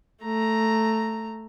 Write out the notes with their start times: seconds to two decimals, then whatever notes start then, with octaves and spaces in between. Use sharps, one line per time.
0.23 A3 A#5